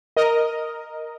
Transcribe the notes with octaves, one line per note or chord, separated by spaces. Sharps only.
A#4 D#5